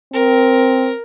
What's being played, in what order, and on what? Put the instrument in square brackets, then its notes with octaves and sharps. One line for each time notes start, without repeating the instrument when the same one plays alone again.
[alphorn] C4 [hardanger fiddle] A#4